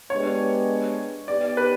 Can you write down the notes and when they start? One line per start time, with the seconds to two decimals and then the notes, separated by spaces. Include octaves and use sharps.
0.10 G#3 B3 D4 G4 B4 C#5
1.28 B3 D#4 G4 D5
1.57 B4